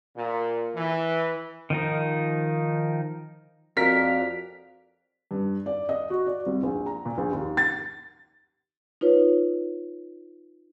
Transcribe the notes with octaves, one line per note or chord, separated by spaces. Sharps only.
A#2
E3
D#3 F3 D#4
F2 F#4 A#4 D5 F5 B6
G2
D5
D#5
F#4
D5
C2
A#1
A#5
A#2
A#1
D#2
A6
D#4 F4 B4 C#5